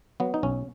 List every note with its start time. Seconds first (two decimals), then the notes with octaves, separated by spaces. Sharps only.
0.20 F#3 B3
0.34 D#4
0.43 B1 C#4